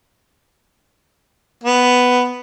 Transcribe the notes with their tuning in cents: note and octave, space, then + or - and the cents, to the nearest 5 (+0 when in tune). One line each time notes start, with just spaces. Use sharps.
B3 +5